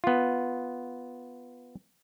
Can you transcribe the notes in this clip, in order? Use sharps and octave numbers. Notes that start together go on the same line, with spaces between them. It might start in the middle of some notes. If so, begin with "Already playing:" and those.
B3 F4